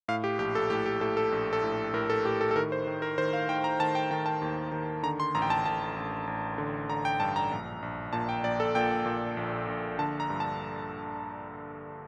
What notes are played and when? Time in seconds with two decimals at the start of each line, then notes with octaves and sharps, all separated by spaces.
0.08 A2 F5
0.24 G4
0.39 A#1 G4
0.55 A4
0.70 A2 G4
0.86 G4
1.01 A2 A4
1.17 A4
1.32 A#1
1.53 A4
1.63 A2
1.94 A2 A#4
2.10 A4
2.25 A2 G4
2.41 A4
2.51 A4
2.56 D#3 A#4
2.72 C5
2.87 D#3
3.02 A#4
3.18 D#3 C5
3.33 F5
3.49 D#3 G5
3.64 A#5
3.80 D#3 A5
3.95 G5
4.11 D#3 G5
4.26 A5
4.42 D#2
4.72 D#3
5.03 D3 A#5
5.20 C6
5.35 A1 A#5
5.42 G5
5.50 A5
5.65 A1 A5
5.96 A1
6.27 A1
6.58 D3
6.89 D3 A#5
7.05 G5
7.20 G2 A5
7.36 A#5
7.51 A#1
7.82 A#1
8.13 A#2 A5
8.29 G5
8.44 A#1 D5
8.60 A4
8.75 A#2 G5
9.06 A#2
9.37 A#1
9.68 A#1
9.98 D3 A5
10.20 A#5
10.30 G2
10.40 A5